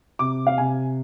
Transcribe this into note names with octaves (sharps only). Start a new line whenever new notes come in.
C3 D6
F5
C3 G#5